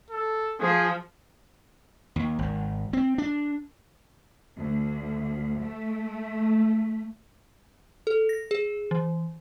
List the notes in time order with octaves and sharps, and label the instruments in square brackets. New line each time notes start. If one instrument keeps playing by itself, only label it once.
[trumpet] A4
[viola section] F3 [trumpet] G#4
[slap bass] D#2
G#1
C4
D4
[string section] D2
A3
[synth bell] A4
A#6
G#4
E3